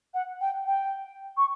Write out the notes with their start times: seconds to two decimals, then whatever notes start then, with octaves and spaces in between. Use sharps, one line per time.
0.14 F#5
0.41 G5
0.66 G5
1.37 C#6